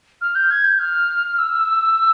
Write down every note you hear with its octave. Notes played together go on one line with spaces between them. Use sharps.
F6
G6
G#6
G6
F6
E6